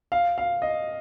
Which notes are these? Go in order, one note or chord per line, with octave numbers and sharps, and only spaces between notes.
F5
F5
D#5